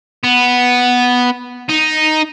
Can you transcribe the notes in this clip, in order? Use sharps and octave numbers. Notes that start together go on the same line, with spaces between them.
B3
D#4